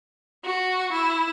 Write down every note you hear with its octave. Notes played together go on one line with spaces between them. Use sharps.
F#4
E4